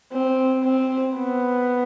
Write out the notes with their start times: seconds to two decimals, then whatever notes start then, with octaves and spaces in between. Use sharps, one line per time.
0.12 C4
0.64 C4
1.16 B3